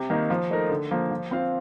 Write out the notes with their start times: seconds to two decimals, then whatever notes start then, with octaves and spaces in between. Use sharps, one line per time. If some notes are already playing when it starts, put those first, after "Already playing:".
Already playing: C3
0.10 D#3 A#3 D#4
0.30 F3
0.50 A3 D#4 A#4
0.70 D3
0.91 F3 A#3
1.11 F3
1.31 C4 F4 C5 F5